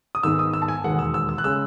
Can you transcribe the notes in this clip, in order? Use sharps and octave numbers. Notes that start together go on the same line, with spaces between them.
D#6
G#2 D#3 G#3 B3 E6
D#6
E6
A5
G#5
E1 D#2 D#3 G#3 F#5
E6
E6
E6
F#6
C#3 G#3 C#4 E6